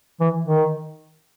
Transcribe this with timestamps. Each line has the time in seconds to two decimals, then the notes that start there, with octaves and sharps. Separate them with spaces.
0.20 E3
0.47 D#3